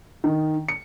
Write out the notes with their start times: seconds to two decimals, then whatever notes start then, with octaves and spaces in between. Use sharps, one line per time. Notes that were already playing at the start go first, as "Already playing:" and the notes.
0.24 D#3
0.68 C#7